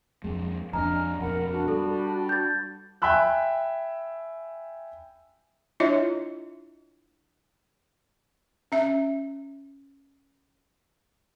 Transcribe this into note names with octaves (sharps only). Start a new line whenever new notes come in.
F2 G#3
F2 C#4 D4 D#5 G#5 A#5 F6
F2 B2 A#4 F#5 B5
D4 F#4 B5
G3 A4
G6 A6
E5 G5 G#5 B5 E6 F#6
D4 E4 F4 C#5 D#5 E5
C#4 E5